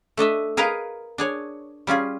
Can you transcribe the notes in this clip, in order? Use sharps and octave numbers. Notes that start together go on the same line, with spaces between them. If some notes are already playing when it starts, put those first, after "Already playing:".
A3 D4 D#5 E5
G#4 A#4 B4 D#5 F5 A#5
D4 G#4 C#5
G3 C#4 F4 G#4